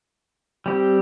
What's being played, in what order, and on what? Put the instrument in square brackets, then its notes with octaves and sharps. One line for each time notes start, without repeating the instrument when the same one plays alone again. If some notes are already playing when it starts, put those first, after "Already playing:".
[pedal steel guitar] G3 C4 G4